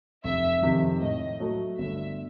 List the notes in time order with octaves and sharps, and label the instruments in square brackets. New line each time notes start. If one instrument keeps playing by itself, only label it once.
[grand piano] F1 [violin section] E5
[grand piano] F2 C3 D#3
[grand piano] A2 [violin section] D#5
[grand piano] F#3 A3
[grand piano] G1 [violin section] E5